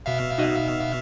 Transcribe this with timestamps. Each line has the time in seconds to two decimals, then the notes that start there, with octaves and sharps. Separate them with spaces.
0.06 B2 E5 F5
0.38 D#4 F#4 D#5